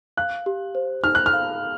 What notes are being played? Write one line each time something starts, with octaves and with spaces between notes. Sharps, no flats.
F5 F#6
G4
C5
D#4 F6
F#6
F6
F5